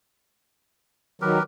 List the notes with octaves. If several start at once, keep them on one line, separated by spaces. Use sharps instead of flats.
D#3 F#3 G4 A#4 B4